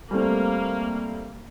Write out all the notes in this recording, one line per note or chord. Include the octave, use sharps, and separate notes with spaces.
G3 A3 A#3 C4